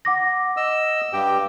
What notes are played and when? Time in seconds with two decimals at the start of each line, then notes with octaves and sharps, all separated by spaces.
0.05 F#5 D6 A#6
0.57 D#5 E6
1.13 G2 G4 G5